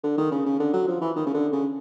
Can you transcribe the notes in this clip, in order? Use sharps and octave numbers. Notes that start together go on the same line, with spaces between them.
D3
D#3
C#3
C#3
D3
F#3
F3
E3
D#3
C#3
D3
C#3